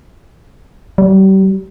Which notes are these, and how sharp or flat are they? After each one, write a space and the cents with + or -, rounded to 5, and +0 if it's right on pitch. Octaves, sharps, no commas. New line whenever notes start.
G3 -35